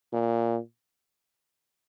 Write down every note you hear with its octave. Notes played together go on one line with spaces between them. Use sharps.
A#2